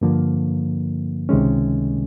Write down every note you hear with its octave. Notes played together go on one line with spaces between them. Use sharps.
G2 D3 F3 A#3
C#2 C3 D#3 G#3 C#4